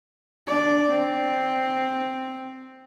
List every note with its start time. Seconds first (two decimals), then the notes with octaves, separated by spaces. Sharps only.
0.47 D4 D5
0.90 C4